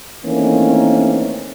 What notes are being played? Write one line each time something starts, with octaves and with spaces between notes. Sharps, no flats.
D#3 E3 A3 A#3 C4 C#4